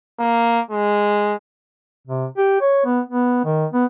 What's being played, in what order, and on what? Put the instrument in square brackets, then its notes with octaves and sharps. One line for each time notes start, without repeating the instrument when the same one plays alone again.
[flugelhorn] A#3
G#3
[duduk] C3
G4
C#5
B3
B3
D#3
B3